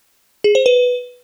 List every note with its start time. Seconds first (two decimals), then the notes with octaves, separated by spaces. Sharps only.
0.44 G#4
0.55 C5
0.66 B4